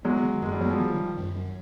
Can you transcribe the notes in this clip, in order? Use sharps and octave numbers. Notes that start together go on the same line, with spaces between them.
F#3 G#3 B3
D#3
F#2 G#3
G3
F#3 B3
F3 G3
D#3
D#3
F#2
F#3